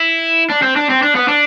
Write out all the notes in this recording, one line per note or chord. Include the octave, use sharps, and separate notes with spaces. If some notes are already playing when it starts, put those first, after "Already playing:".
Already playing: E4
D4
C4
D4
C4
D4
B3
D4